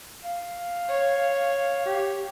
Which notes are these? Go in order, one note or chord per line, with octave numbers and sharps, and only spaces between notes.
F5
C#5
G4